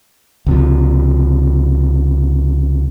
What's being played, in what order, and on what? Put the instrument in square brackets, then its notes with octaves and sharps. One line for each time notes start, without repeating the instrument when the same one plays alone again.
[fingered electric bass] C#2 C3 F3